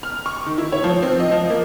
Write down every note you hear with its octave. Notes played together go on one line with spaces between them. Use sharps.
F6
C#6
D#3
E4
C#5
F3
C4
D#5
F3
A#3